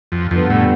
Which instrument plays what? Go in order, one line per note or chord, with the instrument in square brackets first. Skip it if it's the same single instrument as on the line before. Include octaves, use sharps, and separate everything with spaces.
[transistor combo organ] F2
[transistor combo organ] F2 [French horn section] D3 G3 B3
[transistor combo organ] A2